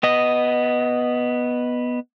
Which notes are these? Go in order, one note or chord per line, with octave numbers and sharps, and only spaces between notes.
B3 D#5